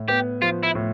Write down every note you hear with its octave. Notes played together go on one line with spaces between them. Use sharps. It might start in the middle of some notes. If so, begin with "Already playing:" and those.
Already playing: A2
B3 G4
F3 F4
E4
A2